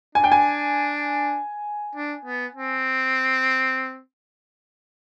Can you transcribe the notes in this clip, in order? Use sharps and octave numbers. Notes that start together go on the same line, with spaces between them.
D4 G#5
G5
G#5
D4
B3
C4